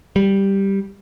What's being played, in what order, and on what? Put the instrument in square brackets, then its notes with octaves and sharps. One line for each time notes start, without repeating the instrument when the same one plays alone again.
[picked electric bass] G3